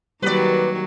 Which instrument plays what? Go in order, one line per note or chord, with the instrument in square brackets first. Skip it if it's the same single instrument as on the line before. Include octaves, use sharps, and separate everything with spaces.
[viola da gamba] D#3 F#3 [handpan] G3 A#3 G4 [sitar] B4 D5